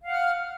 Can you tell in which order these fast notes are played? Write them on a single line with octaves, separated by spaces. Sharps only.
F5 F#5 F6